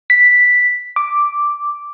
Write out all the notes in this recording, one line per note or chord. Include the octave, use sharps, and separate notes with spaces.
B6
D6